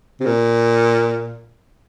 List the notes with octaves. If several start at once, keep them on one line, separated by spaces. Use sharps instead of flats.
C3
A#2